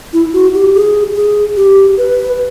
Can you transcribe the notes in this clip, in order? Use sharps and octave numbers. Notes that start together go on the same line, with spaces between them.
E4
F#4
G4
G#4
G#4
G4
B4